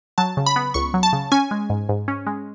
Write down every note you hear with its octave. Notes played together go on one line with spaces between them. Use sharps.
F#3 A5
C#3
B5
B3
C#2 C#6
F#3
A5
C#3
C#4 G#5
G#3
G#2
G#2
C#4
G#3